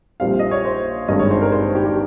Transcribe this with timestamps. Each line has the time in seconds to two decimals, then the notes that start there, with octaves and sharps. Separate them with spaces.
0.20 A#1 A#2 G3 C4 F5
0.39 D#5
0.51 C#5
0.65 C5
1.08 G#1 G2 D#3 G#3 C#4 D#5
1.19 C#5
1.31 C5
1.42 A#4
1.52 C5
1.75 G4
1.86 G4